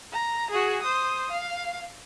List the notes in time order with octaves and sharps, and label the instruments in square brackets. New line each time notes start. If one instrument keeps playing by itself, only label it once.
[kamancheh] A#5
F#4 G#4
C5 D#6
F5